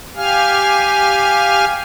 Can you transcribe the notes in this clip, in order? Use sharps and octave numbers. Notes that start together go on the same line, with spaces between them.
G4 F5 G#5 F6